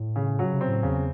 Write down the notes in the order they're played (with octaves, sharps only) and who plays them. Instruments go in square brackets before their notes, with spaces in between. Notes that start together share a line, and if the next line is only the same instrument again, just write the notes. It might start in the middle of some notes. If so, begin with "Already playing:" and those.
Already playing: [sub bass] A2
[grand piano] C#3
F#3
[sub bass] C3
[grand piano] C4
[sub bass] A2
[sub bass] E2 [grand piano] C#3